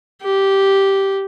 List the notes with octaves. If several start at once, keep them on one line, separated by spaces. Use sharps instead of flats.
G4